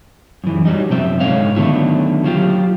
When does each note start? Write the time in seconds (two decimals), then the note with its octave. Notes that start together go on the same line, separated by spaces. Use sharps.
0.44 F#2 E3
0.65 F#3 G3 D#4
0.89 F#2 C3 F3 C4 G4 E5
1.20 G#2 D3 C#5 F5
1.57 D3 D#3 F#3 A3 B3 E4
2.24 F#3 F4 G4